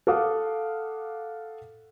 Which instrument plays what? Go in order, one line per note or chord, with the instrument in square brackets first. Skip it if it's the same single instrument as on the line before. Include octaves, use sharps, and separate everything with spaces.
[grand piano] A4 F5 F#5 D6 D#6